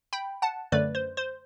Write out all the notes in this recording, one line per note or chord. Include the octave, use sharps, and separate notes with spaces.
G5 B5
F#5 A5
F#2 D3 A3 B4 D5
C5
C5